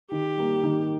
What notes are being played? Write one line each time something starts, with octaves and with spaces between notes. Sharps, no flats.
D#3 G4
G3 A#3
D#3